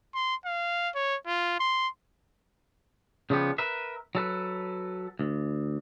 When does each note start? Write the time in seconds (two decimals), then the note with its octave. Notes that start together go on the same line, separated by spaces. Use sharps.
0.15 C6
0.46 F5
0.95 C#5
1.27 F4
1.60 C6
3.30 C#3 F3 G3 B3
3.58 A#4 B4 E5
4.15 F#3 A4 B4
5.19 D2